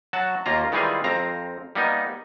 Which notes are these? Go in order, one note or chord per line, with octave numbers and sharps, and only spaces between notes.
F#3 F#4 A5
D#2 A#3 F4 A#5
D#3 E3 G3 G#3 F4 G#4
F2 C4 F5 A#5
G3 A#3 B3 D#4